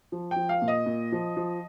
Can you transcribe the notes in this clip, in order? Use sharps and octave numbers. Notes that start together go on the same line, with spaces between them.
F3
G5
F3
F5
A#2
D#5
A#2
F3
F3